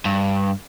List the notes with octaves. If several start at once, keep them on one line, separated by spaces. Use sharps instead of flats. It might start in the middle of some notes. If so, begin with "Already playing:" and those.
G2